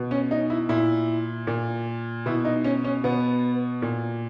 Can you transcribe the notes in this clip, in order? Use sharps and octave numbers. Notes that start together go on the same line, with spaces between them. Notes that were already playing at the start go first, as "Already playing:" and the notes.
Already playing: B2
C#4
D#4
E4
A#2 E4
A#2
B2 E4
D#4
C#4
C#4
B2 B3
A#2